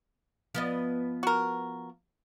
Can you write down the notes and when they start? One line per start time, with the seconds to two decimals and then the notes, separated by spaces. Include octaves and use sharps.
0.55 F3 B3 D#5
1.23 F#4 A#4